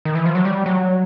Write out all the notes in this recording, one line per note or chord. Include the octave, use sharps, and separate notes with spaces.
D#3
E3
F3
F#3
G3
F#3